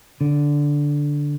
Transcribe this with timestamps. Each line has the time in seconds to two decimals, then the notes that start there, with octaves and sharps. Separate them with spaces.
0.21 D3